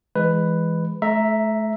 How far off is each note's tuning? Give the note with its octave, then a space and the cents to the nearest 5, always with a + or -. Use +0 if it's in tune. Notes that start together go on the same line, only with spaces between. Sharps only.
E3 +0 G#3 -10 B4 +5
A3 -35 E5 +0 A#5 +0